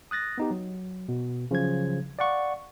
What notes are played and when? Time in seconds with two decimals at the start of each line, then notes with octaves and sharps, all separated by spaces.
0.11 D#6 F#6 A6 A#6
0.38 B3 D#4 G4
0.51 F#3
1.09 B2
1.51 C#3 F3 F#3 G#6
2.19 D5 F5 F#5 C#6